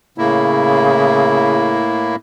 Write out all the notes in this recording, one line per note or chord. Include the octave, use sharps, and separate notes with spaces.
A2 C#3 A#3 E4